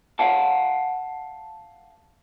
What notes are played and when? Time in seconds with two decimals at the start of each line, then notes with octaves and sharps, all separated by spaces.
0.19 F5 F#5 A5